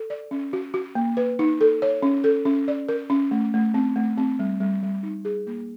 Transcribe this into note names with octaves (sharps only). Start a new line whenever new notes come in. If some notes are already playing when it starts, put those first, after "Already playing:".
Already playing: A4
D5
C#4
F#4
F#4
A#3
B4
D#4
A4
C#5
C#4
A4
C#4
D5
A#4
C#4
A3
A3
C4
A3
C4
G3
G3
G3
D#4
G#4
A#3